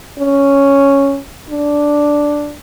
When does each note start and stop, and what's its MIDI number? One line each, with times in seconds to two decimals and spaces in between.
0.18 1.19 61
1.50 2.55 62